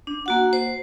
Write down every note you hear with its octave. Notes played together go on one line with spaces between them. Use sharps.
D4
A#3 F#4 F#5
C5